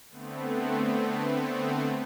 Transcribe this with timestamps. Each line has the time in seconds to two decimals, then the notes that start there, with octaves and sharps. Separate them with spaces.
0.10 D3 A3 B3 C4